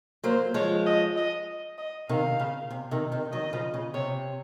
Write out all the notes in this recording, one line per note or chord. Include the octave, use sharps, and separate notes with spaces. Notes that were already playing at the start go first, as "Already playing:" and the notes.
F#3 A#3 C5
F3 G#3 C#5
D#5
D#5
D#5
C3 D#3 F5
C#3
C3
C3 D#3
C3 D#3
D#3 F#3 D#5
C#3 F3
C#3
C3 C#5